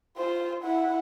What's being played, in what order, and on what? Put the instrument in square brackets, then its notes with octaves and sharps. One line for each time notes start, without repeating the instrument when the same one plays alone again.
[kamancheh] F4 C5
E4 F#5